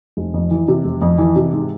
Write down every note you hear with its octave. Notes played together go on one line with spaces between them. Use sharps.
F1
F2
E3
C3
F1
F2
E3
C3
G#2